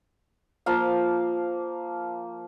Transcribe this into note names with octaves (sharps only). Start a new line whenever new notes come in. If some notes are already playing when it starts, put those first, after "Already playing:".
F3 A#3 F5